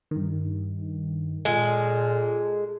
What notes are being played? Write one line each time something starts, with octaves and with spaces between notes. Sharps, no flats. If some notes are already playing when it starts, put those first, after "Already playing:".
G2 D#3
A#2 G#3 A4